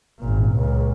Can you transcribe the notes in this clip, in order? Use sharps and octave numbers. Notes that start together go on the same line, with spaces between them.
G#1 A#2
C#2 A#2